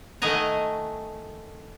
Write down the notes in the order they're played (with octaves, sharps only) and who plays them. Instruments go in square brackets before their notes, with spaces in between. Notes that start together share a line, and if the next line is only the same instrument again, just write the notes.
[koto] D#3 A3 D#5 F#5 G#5 A#5